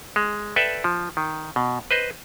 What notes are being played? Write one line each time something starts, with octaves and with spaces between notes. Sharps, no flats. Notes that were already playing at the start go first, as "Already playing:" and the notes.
G#3
A4 B4 D5 E5 G5
F3
D#3
B2
B4 C5 D#5